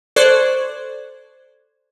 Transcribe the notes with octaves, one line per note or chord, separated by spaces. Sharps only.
A4 C5 D5 C#6 F#6 G#6